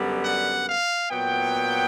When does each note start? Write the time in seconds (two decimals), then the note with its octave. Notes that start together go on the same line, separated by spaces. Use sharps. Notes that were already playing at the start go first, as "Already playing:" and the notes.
Already playing: F#2 D3 G3 B3
0.24 F#5
0.68 F5
1.11 A#2 F#3 B3 G5